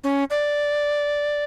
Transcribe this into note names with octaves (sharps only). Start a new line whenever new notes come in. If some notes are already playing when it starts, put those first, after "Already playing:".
C#4
D5